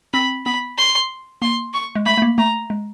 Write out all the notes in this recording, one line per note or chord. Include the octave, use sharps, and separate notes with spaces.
C4 B5
B3 B5
C6
A#3 C6
C#6
G#3
A3 B5
A3
A#3
A3 A#5
G#3